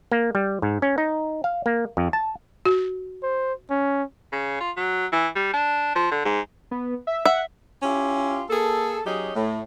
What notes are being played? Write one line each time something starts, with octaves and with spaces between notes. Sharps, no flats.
A#3
G3
G#2
C#4
D#4
F5
A#3
F2
A5
F#4
C5
C#4
C#3
F4
F#3
E3
G3
D4
F3
D3
G#2
B3
E5
E5 F#5
C#4 E4 F4 G4
A#3 G#4 A4
F#3 C#4 D#4 G4 G#4
A2